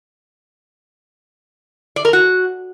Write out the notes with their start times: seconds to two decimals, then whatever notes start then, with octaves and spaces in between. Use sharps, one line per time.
1.96 D5
2.05 A#4
2.13 F#4